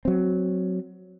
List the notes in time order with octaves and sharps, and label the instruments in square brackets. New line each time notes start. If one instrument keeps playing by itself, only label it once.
[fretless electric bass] F#3 C4